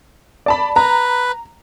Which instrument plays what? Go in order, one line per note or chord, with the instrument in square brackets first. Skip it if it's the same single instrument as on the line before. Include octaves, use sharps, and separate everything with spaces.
[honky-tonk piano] D5 A5 B5
[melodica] B4 [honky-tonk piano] A#5